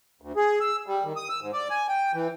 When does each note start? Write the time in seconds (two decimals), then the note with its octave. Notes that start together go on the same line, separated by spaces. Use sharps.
0.22 D2
0.36 G#4
0.60 E6
0.87 G3
1.04 D#3
1.16 D#6
1.29 E6
1.41 G#2
1.53 D5
1.70 G#5
1.89 G5
2.14 E3